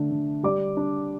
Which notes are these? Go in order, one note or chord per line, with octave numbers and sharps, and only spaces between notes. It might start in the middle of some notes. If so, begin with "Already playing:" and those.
Already playing: D3 A3 D4
D3
G3 D5 D6
D4